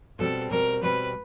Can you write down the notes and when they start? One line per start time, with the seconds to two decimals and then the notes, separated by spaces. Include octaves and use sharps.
0.19 B2 G3 C4 A4
0.51 B2 G3 C4 A#4
0.83 B2 G3 C4 B4